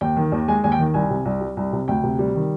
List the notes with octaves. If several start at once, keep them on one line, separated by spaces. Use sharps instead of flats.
D#2 G5
D#3
D#2
G#3 G#5
D#2 G#5
G5
D#3
C2 G#5
C3
C2
G3
C2
C3
D2 G5
C3
G3
D#3